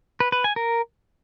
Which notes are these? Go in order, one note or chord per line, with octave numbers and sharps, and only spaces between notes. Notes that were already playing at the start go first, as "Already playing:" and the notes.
B4
B4
G#5
A#4